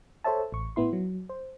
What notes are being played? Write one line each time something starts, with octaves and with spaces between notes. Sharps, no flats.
A4 C5 C#5 E5 A5
A1 C#6
A2 B3 E4 C6
F#3
C5